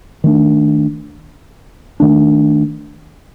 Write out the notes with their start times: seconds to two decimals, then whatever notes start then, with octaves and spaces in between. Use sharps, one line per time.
0.24 D#3 A3 D4
2.00 D#3 A3 D4